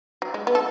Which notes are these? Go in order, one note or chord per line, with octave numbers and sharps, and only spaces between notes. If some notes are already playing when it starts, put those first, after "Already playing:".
F#3
G#3
B3
A4